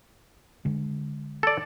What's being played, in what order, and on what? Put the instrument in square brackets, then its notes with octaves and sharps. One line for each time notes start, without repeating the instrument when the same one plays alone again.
[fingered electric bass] D3 G#3
[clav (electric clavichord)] A4 D5